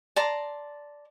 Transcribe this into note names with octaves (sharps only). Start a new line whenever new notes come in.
D5 A5 A#5 C6